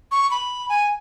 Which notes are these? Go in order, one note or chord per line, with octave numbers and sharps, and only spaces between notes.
C#6
B5
G#5